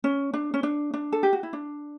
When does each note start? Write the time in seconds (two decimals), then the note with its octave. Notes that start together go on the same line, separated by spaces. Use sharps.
0.04 C#4
0.34 D4
0.54 C#4
0.63 D4
0.94 D4
1.12 A4
1.23 G4
1.33 F#4
1.43 E4
1.53 D4